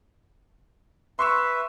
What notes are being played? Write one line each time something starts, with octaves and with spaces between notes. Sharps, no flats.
B4 E5 C6 C#6 E6